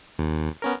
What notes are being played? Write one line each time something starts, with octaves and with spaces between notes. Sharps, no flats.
D#2
B3 C#4 A#4